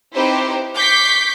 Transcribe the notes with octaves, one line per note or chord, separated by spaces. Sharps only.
C4 D#4 E4 G4 B4 C5
C#6 D6 G6 B6 C7